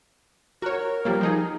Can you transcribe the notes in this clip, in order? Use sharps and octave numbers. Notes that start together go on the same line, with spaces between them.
F#4 A#4 C#5
F3 G3 A#3
F3 D#4 G#4